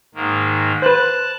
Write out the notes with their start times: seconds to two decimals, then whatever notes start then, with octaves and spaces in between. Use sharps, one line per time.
0.15 G#2 D#3 A#3
0.82 B4 C5 A5 F#6